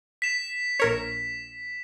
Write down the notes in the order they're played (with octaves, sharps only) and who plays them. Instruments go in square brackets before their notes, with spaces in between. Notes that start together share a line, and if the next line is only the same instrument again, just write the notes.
[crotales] B6 E7
[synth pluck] A#1 A#4 C#5